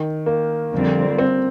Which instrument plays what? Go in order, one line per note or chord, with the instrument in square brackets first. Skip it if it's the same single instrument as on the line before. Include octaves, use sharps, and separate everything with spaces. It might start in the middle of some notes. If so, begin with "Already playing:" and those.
Already playing: [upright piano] D#3
A#3
[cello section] F2 D3 G3 C4
[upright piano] C4